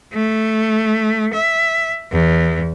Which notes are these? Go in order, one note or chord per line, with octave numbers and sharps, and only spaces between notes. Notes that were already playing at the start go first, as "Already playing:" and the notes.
A3
E5
E2